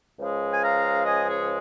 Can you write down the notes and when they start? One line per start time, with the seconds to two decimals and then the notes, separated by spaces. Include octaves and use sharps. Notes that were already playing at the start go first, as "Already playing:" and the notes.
0.18 C#2 C#3 F3 G#3
0.51 G#5
0.62 F5 A#5
1.06 D#5 G#5
1.28 G#4 C#5